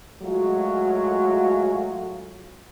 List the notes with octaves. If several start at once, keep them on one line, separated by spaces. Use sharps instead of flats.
F#3 G#3 A3 F4 F#4